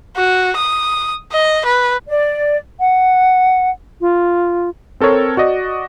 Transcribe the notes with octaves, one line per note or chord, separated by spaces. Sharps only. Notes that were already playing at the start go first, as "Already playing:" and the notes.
F#4
D#6
D#5
B4
D5
F#5
F4
C4 A4 A#4 C#5
F#4 D5 D#5